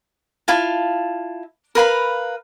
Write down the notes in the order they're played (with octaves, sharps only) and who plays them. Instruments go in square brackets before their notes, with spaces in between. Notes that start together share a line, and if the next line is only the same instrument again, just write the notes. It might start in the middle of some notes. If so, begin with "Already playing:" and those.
[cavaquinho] E4 F4 F5 A5
A#4 B4 F5 B5